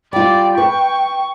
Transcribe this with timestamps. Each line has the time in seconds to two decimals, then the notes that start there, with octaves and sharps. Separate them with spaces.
0.13 G3 F4 D5 G5
0.58 B4 C#6